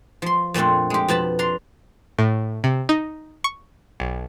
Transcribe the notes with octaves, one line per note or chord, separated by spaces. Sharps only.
F3 C6
F2 A#2 A3 C4 D4
G#3 G4
F2 B2 A5 B5
D4 A#5 C6
A2
C3
D#4
C#6
B1